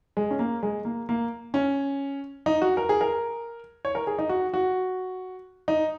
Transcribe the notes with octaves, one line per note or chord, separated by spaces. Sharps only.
G#3
C#4
A#3
G#3
A#3
A#3
C#4
D#4
F#4
A#4
G#4
A#4
C#5
A#4
G#4
D#4
F#4
F#4
D#4